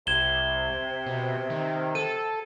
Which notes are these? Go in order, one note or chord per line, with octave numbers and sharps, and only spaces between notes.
C2 C3 G#6 E7 G7
B2
D#3
A4 D#7